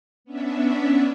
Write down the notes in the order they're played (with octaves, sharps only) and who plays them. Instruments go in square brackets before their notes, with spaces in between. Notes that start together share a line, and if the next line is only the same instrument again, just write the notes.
[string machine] B3 C#4 D4 E5